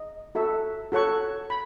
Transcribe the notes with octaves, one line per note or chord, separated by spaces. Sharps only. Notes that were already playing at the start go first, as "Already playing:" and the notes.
Already playing: D#5
F#4 A4 E5
F#4 A4 C#5 F#5 C#6
B5